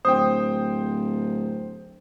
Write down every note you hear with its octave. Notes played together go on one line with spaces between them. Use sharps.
D1 C5 G5 D#6